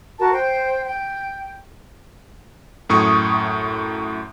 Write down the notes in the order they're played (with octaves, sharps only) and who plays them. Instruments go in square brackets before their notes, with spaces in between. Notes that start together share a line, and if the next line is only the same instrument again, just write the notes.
[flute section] F#4 A#4 A5
C5 G5
G5
[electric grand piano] F#2 A2 C#6 D#6 G#6